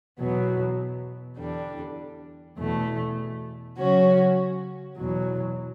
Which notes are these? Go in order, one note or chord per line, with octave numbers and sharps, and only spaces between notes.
E2 B2 F#3 B3
E2 D3 G3 D4
E2 B2 A3
C#3 F#3 C#4 F#4 C#5
E2 B2 F#3